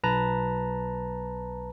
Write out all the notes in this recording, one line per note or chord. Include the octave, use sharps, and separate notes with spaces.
B1 B4 A5 A#5